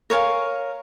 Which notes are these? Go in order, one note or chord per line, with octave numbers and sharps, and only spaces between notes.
A#4 C#5 F5 G#5